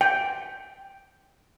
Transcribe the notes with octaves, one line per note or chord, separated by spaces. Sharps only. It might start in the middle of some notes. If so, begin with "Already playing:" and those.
G5